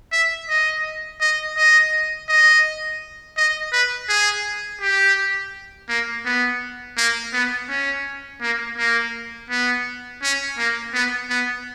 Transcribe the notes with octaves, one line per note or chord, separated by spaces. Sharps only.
E5
D#5
D#5
D#5
D#5
D#5
B4
G#4
G4
A#3
B3
A#3
B3
C#4
A#3
A#3
B3
C#4
A#3
B3
B3